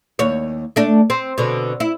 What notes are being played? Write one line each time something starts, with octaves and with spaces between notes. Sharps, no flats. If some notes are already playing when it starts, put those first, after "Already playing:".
D#2 C#5
A3 D4
C4
B2 D3
E4